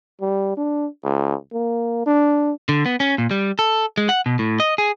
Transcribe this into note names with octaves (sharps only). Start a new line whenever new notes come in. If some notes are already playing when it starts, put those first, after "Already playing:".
G3
D4
C#2
A#3
D4
D3
B3
C#4
A#2
G3
A4
G#3
F#5
B2
A2
D#5
G#4